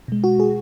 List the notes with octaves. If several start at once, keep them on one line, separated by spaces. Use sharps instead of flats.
B2 G#3
F#4
G#4